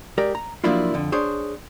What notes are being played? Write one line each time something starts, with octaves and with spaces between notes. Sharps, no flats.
G#3 G4 A#4 D5
A#5
F3 F#3 A#3 D4 E4 F4
F2 D3
D4 G#4 C5 C#5